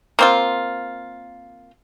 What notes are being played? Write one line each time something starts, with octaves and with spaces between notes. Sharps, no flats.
A#3 C4 F4